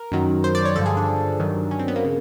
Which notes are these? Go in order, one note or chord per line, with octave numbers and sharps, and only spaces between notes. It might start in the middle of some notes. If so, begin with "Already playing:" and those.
Already playing: A#4
F#2 D#3 F#3
C5
D5
C#5
G2 D3 F3 A4
G#4
D4
G2 D#3 F#3
C#4
C4
B3
A#3
C#3